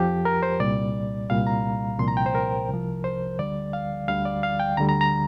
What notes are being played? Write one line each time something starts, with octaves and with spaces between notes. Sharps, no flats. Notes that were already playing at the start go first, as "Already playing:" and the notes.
Already playing: F2 F3 G4
A#4
C5
C2 A#2 G3 D5
C2 A#2 G3 F5
A#5
C2 A#2 F3 C6
A#5
G5
C5
A#4
C2 C3 F3
C5
D2 D3 G3 D5
F5
D2 D3 G3 F5
D5
F5
G5
D2 D3 G3 A#5
A#5
A#5